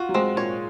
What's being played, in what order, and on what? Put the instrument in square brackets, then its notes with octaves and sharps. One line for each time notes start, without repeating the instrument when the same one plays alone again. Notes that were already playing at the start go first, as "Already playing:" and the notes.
Already playing: [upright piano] F4 [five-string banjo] F#4
[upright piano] F#3
[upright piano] G#3 [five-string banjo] C4
[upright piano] A#2 [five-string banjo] C#5